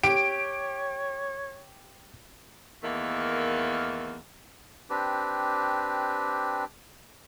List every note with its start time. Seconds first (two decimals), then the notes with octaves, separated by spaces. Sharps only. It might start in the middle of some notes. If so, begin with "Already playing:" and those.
0.03 G4 C#5 D7
2.84 E2 D#3 A3 A#3
4.90 C4 D4 G4 B4